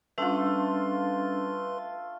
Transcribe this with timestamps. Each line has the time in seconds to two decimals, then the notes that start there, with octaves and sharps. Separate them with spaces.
0.18 G3 A3 C#4 D4 F4 B4 C6